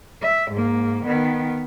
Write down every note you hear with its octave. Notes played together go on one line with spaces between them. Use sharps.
E5
G#2 A#3
D#3 B3